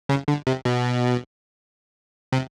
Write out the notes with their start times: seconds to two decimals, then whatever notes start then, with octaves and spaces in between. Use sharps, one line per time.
0.09 C#3
0.28 D3
0.47 C3
0.65 B2
2.33 C3